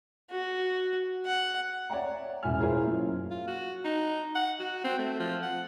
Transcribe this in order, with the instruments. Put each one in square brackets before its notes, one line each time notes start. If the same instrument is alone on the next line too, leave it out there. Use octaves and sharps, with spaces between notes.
[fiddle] F#4
F#5
[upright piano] C#5 D5 E5 F#5 A#5
E1 A1 E4 E5 G#5 F6
E4 F4 G#4 A#4 C5 C#5
F#2 A#3 F4
[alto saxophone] F4
F#4
D#4
F#5
F#4
C4
A3
F3
F#5